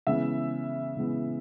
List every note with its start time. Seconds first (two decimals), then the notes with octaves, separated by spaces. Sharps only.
0.07 C#3 E3 G#3 B3 E5
0.96 C#3 E3 G#3 B3